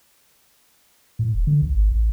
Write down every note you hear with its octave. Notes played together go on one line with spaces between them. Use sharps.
A2
E1
D3
C2
G#1
A1